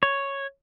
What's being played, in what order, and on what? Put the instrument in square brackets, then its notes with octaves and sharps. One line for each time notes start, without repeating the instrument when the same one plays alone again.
[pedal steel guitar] C#5